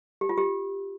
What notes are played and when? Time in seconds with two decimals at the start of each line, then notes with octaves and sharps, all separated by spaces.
0.21 G4
0.29 F4
0.38 G4